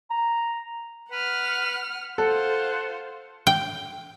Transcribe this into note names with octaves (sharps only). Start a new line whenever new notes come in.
A#5
B4 F#5 F6
F4 A4 C5 F#5
G5